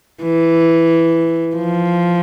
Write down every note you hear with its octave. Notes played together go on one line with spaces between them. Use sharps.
E3
F3